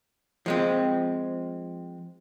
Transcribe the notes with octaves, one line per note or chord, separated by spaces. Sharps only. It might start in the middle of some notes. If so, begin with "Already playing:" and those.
F3 G#3 C4